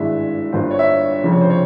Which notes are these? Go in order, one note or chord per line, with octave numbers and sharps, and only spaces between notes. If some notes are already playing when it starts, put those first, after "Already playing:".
Already playing: G#1 G2 E3 G#3 E5
G1 G2 G3 A#3 F4 C5
C#5
E5
F1 F2 C#3 F3 C4
C#5
C5
C#5